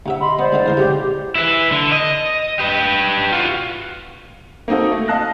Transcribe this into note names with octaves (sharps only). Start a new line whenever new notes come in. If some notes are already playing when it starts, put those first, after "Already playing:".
D2 C3 E5 F#5
D#5 B5 C6
B3 C5 D5
C#2 D3 D#3
E2 A#4 C6
B1 C#3 G4
E4 B4
D3
D#5
G4 B4
F4 F#4
A#3 C4 D#4 F#4 A4
A3
D#5 F5 A5 F#6 A#6